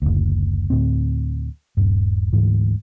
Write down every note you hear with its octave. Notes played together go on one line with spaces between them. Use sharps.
F#1 D2
D2 A2 C4
D#1 G2
D2 G#2 E3